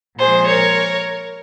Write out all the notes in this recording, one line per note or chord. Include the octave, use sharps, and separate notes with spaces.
A#2 F3 G#3 G#4 C5
A#4 C#5